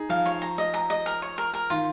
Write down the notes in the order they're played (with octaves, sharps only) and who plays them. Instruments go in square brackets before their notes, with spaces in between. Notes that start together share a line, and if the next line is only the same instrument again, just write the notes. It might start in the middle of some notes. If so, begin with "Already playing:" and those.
Already playing: [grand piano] D#4 G#4
[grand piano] F3 [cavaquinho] F5
[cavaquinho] C#5
A#5
D#5
A#5
D#5
A#4
C#5
A#4
A#4
[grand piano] D#3 [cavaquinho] F4